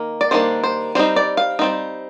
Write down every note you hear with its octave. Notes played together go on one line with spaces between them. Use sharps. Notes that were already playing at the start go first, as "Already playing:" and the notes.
Already playing: D#3 A#3
D5
D#3 G3 A#3 D4 C5
C5
G3 C4 D#4 C5
D5
F5
G3 C4 D#4